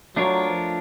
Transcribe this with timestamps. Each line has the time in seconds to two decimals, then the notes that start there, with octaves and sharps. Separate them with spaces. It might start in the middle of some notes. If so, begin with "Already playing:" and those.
0.16 F#3 A3 D4 F4 A#4 C#5
0.49 F3